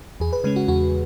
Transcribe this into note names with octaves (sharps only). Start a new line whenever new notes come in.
E2 G#4
B4
C#3 G#3 C#4 B4
F#4
E2 F#4